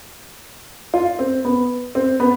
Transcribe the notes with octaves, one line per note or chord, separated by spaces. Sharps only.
F4
C4
B3
C4
B3